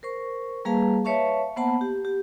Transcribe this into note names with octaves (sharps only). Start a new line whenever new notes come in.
A#4 C5 C#6
G3 A#3 G#4 B4 F5 A5
B4 C#5 E5 F5 A5 C#6
A#3 B3 C5 F#5 A5 B5
G4
G4